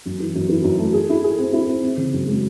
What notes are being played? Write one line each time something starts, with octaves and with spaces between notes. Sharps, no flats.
F#2
E3
F#2
E3
F#2
A3
G#4
E4
G#4
C4
E4
C4
C4
C#3
F#2
G#3